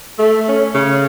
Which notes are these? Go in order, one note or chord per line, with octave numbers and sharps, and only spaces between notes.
A3
C#4
C#3